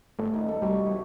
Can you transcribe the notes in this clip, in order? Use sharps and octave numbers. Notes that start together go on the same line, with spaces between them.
G1 A3
D#1 D#4
A4 A#5
C2 G3 F#4 B4 C#6
E1 E4 D#5